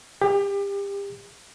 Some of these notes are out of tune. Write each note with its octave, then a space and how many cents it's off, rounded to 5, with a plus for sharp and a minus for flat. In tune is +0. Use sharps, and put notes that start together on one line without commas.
G4 +30